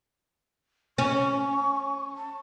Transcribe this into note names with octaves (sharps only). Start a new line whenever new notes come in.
C#4 C#6
A5